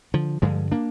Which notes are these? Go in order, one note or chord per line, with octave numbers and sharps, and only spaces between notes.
D3 F3
G2 D3 F3 G#3
A#3 D4